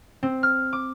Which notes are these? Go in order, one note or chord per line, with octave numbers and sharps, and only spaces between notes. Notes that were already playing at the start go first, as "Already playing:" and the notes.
C4
F6
D6